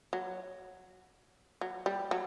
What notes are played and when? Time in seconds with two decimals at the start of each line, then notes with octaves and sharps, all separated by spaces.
0.13 F#3
1.61 F#3
1.86 G3
2.11 F#3